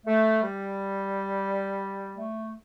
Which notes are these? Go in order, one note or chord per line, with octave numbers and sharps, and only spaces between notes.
A3
G3
A3